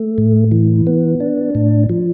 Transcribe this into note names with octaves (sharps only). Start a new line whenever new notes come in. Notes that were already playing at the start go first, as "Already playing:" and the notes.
Already playing: A3
A2
E3
B3
D4
A2
F3